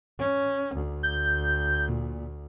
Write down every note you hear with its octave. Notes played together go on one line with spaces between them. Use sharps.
C#4
D2
G6
A#2